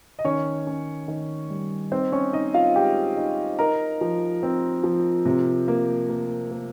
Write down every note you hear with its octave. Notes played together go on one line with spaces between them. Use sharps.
D#5
D#3 C#4 C#5
C#4
D#3
G3
C4 D#4 C5
C#4 C#5
D#4 D#5
F4 F5
G#3 G4 G5
D#4
D#4 A#4 A#5
F3
C4
F3
C3
A#3
A#3
A#3